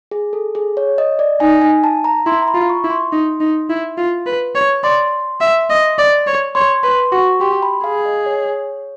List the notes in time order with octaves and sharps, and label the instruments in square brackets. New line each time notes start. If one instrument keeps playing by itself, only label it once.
[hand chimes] G#4
A4
G#4
C#5
D#5
D5
[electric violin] D#4 [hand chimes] G#5
[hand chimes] G#5
A5
A#5
[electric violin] E4 [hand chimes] C6
[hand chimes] A#5
B5
[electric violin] F4
[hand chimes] C#6
[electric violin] E4
[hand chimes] C6
[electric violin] D#4
D#4
E4
F4
B4
C#5
[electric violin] D5 [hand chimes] C6
[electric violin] E5
D#5
D5
C#5
[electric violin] C#5 [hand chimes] C6
[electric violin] B4 [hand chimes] C6
[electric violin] F#4 [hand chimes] C#6
[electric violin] G4 [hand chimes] C6
[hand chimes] B5
[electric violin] G#4 [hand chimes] F5
[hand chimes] D#5
C#5